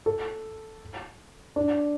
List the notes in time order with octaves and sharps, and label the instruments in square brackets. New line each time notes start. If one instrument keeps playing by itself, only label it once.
[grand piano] A4
D4